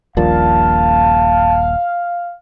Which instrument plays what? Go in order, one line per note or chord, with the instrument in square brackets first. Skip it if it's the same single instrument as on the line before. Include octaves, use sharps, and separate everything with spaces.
[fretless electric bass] D#1 A#1 A#2 [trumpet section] F5 [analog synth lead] A5